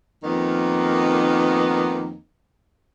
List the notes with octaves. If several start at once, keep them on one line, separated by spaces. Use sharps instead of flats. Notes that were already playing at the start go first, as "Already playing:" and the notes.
F2 D#3 A#3 B3 D#4